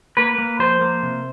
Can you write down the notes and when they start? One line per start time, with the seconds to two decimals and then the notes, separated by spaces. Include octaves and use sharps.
0.17 A#3 B4
0.38 A#3
0.59 F3 C5
0.81 A#3
1.03 C3